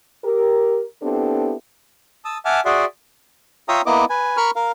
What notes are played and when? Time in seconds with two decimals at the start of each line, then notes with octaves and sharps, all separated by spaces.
0.25 G4 A#4
1.03 B3 C4 D4 E4 G4 A4
2.25 A5 D#6 E6
2.45 E5 F#5 G#5 A5 D6 F6
2.65 F#4 G#4 D5 E5 F#5 C6
3.69 F4 C#5 E5 G5 A#5 D#6
3.86 A#3 B3 E4 D#5 D6
4.10 B4 G#5
4.37 A#4 B5 C#6 F6
4.56 A#4 F5